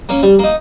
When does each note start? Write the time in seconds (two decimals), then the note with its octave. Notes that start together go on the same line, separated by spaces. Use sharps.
0.09 A#3 C#4
0.23 G3
0.39 A#3 D#4